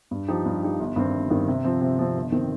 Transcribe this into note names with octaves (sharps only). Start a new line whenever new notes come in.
G2
F3 D#4 G4
G2
F3 D#4 G4
G1
G2 D#3 C4
G1
G2 D#3 C4
C3
F3 C4
C3
F3 C4
G1
D#3 C4